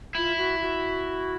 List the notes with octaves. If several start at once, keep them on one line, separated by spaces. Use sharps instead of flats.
E4 F4
F#4
F#4